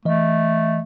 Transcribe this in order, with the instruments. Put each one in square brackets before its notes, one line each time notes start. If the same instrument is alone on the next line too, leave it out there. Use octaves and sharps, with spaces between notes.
[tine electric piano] E3 D#5 [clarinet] A3